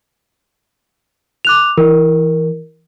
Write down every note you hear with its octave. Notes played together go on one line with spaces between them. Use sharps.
D6 F#6 F7
E3 A#4